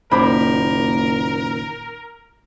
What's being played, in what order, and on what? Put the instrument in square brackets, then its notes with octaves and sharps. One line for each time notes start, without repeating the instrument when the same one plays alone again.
[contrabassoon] F#1 [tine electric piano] A#2 D#3 [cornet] A#4 [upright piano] C5 B5 D6